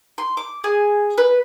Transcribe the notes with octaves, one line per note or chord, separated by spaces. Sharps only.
C6
D6
G#4
B4